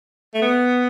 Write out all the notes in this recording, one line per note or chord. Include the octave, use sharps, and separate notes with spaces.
A3
B3